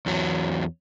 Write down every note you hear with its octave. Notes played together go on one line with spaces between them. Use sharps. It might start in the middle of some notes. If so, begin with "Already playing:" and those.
E2 F#3